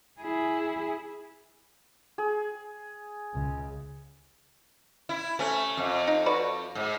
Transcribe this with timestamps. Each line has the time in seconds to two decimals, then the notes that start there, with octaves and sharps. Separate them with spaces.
0.21 E4 G#4
2.18 G#4
3.33 C#2 C#3
5.09 E4
5.39 C3 A3 C#4
5.77 F2
6.07 D#4
6.26 F#4 B4 D5
6.75 G#2